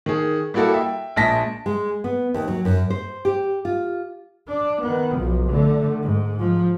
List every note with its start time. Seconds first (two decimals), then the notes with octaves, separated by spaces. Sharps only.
0.06 D#3 G#4
0.54 G3 A#3 E4 F#4 A4
0.72 E5 G5
1.16 A#1 G#3 A5 A#6 B6
1.66 G#3
2.04 B3
2.34 D#2
2.48 F#3
2.65 F#2
2.90 C5
3.25 G4
3.65 F4
4.48 D4
4.82 D#3 B3
5.18 B1 F3
5.50 D3 A3
6.02 G#2
6.39 F3